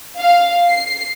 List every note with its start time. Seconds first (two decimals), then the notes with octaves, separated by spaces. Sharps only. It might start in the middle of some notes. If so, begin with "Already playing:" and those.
0.19 F5
0.68 C7